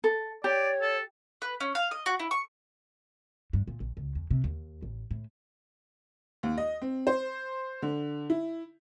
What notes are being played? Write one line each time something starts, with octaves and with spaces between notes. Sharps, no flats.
A4
G4 C#5 D5
A4
B4
C#4
F5
D#5
F#4
E4
C#6
G2
A#2
A#1
C#2
E2
C3
D#2
A1
A2
D#2
D#5
C4
C5
D3
E4